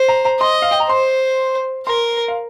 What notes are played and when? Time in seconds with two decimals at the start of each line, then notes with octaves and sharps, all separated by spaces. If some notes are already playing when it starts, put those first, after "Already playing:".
Already playing: C5
0.08 A#5
0.25 A#5
0.40 D#5 C6
0.62 F5
0.71 G5
0.80 A#5
0.89 C5 C6
1.86 A#4 C6
2.28 F5